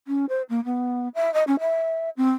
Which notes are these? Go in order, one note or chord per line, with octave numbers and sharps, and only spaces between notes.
C#4
C5
A#3
B3
E5
D#5
C#4
E5
C4